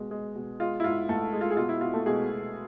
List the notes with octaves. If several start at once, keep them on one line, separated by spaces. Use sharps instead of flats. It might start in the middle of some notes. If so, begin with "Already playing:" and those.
Already playing: B2 G#3
G#3
B2
G#3 F4
E4
G#2 F4
G#2 A3 A4
G#3
F4
G#4
B2 F4
E4
B2 F4
A3 A4
B2 G#3 G#4
B2